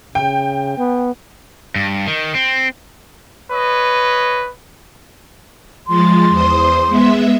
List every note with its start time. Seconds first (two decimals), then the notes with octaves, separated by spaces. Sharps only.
0.15 C#3 G5
0.78 B3
1.76 G2
2.07 D#3
2.35 C4
3.52 B4 C#5 D#5
5.87 F3 G#3 C6 A6
6.29 E2 C5 D#6
6.87 G#3 B3 E5